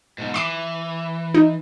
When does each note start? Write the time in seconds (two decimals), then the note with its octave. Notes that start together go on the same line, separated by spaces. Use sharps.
0.18 G#2 B2
0.34 E3 C6 D6 C7
1.34 D#4